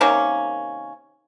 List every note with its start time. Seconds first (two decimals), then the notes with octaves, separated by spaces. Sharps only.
0.01 C3 D#3 A#3 C#4